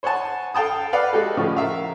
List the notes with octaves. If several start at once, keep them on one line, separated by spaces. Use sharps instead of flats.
C5 C#5 F#5 G#5 A5
A4 F5 G5 A5 D#6
B4 D5 F5 F#5
G#3 F#4 G4 A4
A2 C#3 F3
A#4 E5 F5